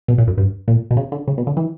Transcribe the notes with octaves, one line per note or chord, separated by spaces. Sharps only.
B2
A#2
F#2
G2
A#2
B2
C#3
D3
C#3
B2
D3
E3